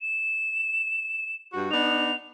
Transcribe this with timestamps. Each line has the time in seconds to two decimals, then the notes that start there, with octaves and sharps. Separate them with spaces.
0.01 E7
1.52 G2 F#4
1.71 B3 D4 D#4 F7